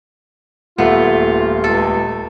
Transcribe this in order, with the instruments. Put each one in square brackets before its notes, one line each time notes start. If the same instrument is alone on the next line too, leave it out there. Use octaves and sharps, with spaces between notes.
[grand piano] D#1 A3 [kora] B3 [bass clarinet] F4
[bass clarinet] C#2 [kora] A4